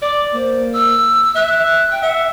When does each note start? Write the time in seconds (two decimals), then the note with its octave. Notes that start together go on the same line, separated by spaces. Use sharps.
0.02 D5 D6
0.34 A#3 C5
0.73 E6
1.35 E5 F#6
1.91 G5
2.02 E5 F#5